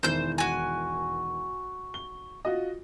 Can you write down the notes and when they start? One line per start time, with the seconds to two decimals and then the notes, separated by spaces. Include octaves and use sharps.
0.03 E1 D#3 E3 C5 G6
0.38 F#4 G#5
1.94 G7
2.45 F4 F#4 D#5